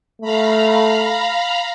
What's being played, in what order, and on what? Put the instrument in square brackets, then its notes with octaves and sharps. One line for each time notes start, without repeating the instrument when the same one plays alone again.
[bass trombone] A3 [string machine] F5 A#5 B5